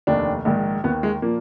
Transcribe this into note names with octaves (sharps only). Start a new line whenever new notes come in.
F1 D#2 D#3 D4
A#1 G#2 D#3
D#2 D#3 B3
G#3
A#2 F3 A#3